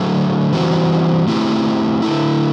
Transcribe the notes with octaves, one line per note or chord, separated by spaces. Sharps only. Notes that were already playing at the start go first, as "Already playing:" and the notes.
Already playing: D3 F#3 A3
E3 G3 C4 F#4
A3 C4 E4 G4
D3 A3 E4